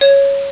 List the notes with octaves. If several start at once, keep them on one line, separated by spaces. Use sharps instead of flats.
C#5